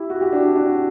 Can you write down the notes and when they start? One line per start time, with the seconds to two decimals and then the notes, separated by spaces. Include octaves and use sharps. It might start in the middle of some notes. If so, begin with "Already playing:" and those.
Already playing: E4 G4
0.10 F#4
0.21 G4
0.32 D4 F#4
0.55 D4 F#4